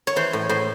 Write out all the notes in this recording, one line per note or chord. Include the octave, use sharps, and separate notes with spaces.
C#5
E3 C5
A2
A2 C5